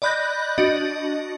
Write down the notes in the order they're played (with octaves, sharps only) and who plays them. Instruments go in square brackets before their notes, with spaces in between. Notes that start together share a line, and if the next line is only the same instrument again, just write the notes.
[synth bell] D5 D#5 B5 F#6 G6 A#6
D4 F#4 D#5